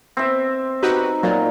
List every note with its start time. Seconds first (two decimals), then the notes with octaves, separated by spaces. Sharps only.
0.17 C4 E5
0.82 D#4 F#4 G4 B4
1.23 A#2 F#3